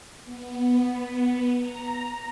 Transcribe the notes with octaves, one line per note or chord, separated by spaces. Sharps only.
B3
A#5